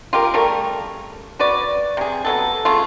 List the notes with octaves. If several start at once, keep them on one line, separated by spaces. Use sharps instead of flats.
F4 G4 A#4
C#3 G3 A3 A#4
F#4 B4 C#5 D5
C3 G#4
F#3 B3 A4
C#3 A3 F4